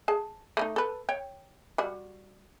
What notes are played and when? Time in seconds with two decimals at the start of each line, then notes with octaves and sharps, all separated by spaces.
0.08 G#4 A5
0.57 A3 B3 D#4
0.76 A4 B4
1.09 C#5 G5
1.78 G3 F#4